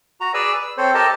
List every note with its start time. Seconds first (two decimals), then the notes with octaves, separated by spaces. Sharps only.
0.21 F#4 A#5
0.34 G#4 B4 D5 G#5 E6
0.62 E6
0.77 C4 A4 C5 C#5
0.94 G4 A4 A#4 D#5 A5